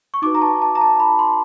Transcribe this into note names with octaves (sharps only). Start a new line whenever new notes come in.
C#6
D#4 F#4 B4 D6
A#5
A5
A5
A#5
A5
B5
C6